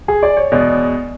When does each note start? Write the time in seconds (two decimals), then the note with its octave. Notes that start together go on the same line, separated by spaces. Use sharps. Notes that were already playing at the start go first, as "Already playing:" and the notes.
0.08 G#4
0.23 D5
0.37 C#5
0.52 E2 B2 G#3 D5